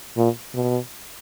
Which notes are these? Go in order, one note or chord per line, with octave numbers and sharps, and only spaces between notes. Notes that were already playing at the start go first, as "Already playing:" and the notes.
A#2
B2